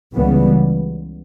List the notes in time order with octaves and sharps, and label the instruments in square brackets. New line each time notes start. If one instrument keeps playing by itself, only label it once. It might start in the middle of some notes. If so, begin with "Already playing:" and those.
[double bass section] C#2 C#3 E3 G3 B3